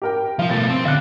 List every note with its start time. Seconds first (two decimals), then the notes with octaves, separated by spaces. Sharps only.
0.02 G4 A#4 G5
0.39 F3 F4 F5
0.50 B2 A3 A6
0.70 C4
0.85 D3 F5 F#6